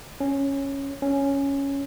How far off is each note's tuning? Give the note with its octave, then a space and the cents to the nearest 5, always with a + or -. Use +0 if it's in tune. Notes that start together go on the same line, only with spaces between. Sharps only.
C#4 -5
C#4 +0